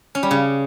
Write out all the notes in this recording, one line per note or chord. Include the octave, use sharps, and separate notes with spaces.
C#4
G3
C#3